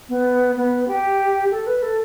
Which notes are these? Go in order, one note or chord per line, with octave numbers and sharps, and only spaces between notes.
B3
B3
G4
A4
B4
A4